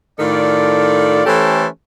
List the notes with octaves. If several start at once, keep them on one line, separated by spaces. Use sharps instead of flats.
A2 D#3 F4 A4 D5
E3 A3 C#4 G4 A4 C5